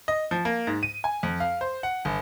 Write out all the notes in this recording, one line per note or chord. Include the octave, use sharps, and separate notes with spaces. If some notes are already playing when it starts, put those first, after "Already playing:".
D#5
F3
A#3
G#2
D#7
G#5
F2
F5
C5
F#5
G1